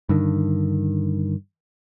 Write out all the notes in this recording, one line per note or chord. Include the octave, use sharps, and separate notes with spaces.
G2 D3 D#3